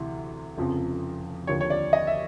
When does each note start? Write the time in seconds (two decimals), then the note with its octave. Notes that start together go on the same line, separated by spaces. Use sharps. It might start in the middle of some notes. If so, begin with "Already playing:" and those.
Already playing: D2 C3 E3
0.57 F1 F2 C#3 F3
1.47 D#2 D3 F3 C#5
1.61 C#5
1.70 D5
1.93 D#5
2.07 E5